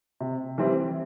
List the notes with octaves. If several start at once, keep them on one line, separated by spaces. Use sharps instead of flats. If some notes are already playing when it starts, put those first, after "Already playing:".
C3
E3 G3 C4